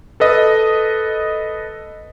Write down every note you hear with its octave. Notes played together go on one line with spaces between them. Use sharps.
A4 B4 D#5